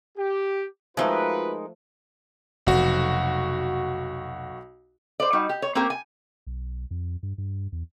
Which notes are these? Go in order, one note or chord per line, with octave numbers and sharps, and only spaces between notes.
G4
F3 G#3 A3 D#4 F4 F#4 A#4 B4
F1 B1 F#4
C5 D5
G3 D#4 F#4
G4
C#5
A#3 C4 C#4 G4 A#4
G#5
B1
F2
G2
G2
E2